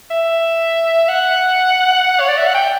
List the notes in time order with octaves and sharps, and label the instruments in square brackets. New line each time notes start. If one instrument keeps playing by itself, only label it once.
[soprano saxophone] E5
F#5
C#5
D5
E5
F#5
G5